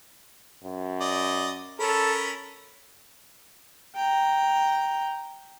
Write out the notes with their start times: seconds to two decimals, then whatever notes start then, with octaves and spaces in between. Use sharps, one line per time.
0.64 F#2
1.01 D5 D#5
1.80 C#4 A4 A#4 B5
3.95 G5 A#5